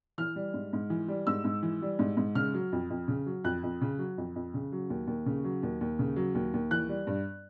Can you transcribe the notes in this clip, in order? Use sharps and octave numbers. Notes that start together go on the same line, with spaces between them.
E3 F6
G3
G#2
G#2
E3
G3
G#2 E6
G#2
E3
G3
G#2
G#2
C#3 F6
F#3
F2
F2
C#3
F#3
F2 F#6
F2
C#3
F#3
F2
F2
C#3
F#3
D#2
D#2
C#3
F#3
D#2
D#2
C#3
F#3
D#2
D#2
E3 F#6
G3
G2